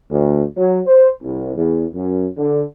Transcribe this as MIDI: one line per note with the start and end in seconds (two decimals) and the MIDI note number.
0.10 0.42 38
0.56 0.80 54
0.85 1.08 72
1.23 1.54 36
1.57 1.86 40
1.94 2.26 42
2.37 2.63 50